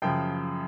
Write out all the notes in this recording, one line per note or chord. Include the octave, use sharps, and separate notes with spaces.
F#2 C#3 F3 G5